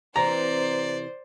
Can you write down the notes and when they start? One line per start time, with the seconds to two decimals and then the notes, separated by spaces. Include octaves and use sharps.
0.16 C3 E3 C5 D5 A#5